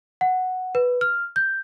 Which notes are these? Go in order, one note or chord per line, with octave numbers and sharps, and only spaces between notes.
F#5
B4
F6
G6